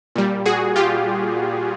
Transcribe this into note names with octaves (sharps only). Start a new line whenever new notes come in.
A#2 G3
F#4 G#4
F4 G4